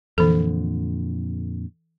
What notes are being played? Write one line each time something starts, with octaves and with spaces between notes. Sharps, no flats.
F2 A#2 D3 E3 A4